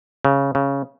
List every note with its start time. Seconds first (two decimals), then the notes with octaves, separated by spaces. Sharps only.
0.25 C#3
0.55 C#3